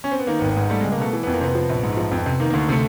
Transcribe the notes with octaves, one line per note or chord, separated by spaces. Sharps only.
C#4
C4
B3
D#3 A#3
G#1 B3
B3
G#2
G3 A3
C#2 G#3
A#3
B2 A3
E3
F2 B3
A#3
C3 B3
F3
A#1
G#2
F3
F2
C3
D#3 A#3
D2 A#3
C3 A3